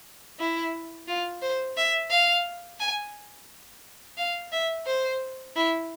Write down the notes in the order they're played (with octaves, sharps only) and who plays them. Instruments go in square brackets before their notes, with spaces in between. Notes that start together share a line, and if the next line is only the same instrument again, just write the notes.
[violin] E4
F4
C5
E5
F5
G#5
F5
E5
C5
E4